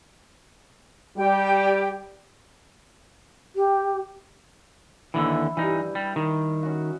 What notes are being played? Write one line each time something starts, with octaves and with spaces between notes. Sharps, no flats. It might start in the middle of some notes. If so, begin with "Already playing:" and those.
G3 G4 G5
G4
D#2 D3 E3 E4 E5
G2 E3 D#4
G3
D#3
C#4 F#4